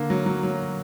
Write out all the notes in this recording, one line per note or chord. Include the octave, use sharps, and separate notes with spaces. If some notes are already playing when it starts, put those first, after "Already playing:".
Already playing: D3 A#3
F#3
F#3
F#3